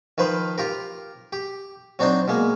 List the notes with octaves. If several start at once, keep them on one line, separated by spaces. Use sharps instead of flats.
D#3 F3 B4 C5
F4 G4 A#4
G4
F#3 C4 D4 D#4 C5
B2 G#3 A#3